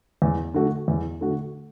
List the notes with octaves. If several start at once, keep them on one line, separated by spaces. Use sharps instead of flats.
E2
D3 A3 F#4
E2
D3 A3 F#4